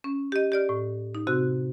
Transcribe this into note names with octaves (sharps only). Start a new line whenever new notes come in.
C#4
G4 D#5
G4 D5 F6
A2
D#4
C3 C4 F#4 F#6